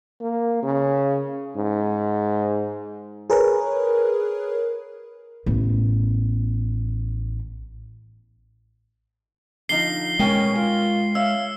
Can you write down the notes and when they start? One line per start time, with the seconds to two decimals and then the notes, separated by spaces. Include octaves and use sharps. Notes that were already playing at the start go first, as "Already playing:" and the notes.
0.21 A#3
0.63 C#3
1.56 G#2
3.30 G#4 A#4 B4 C#5
5.46 A1 B3
9.69 D3 F3 D#4 C7 G7
10.19 B2 G#3 C#4 A#4 G5
10.56 F4 A#4
11.15 C#5 E5 F5 E6